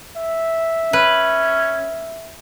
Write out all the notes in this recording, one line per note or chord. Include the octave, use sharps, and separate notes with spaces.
E5
C#4 B4